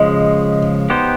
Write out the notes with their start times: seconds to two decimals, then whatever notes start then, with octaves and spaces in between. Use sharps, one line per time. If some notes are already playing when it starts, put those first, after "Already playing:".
Already playing: C#3 F3 G#3 D#5
0.90 B3 D#4 G4 C5